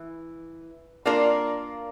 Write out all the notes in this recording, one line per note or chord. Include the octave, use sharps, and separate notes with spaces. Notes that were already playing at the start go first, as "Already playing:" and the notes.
Already playing: E3
A#3 D4 F4 A#4